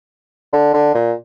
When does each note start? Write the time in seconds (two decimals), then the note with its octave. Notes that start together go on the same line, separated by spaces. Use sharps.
0.53 D3
0.74 D3
0.95 A#2